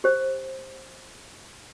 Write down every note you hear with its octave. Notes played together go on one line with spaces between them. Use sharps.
G4 C5